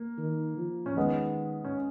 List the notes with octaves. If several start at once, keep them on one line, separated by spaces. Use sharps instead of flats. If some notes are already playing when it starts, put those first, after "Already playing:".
Already playing: A#3
D#3
F3
C#4
D#3 G#3 B3
C#4